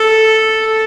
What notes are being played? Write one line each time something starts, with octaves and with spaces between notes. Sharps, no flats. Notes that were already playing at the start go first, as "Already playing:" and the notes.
Already playing: A4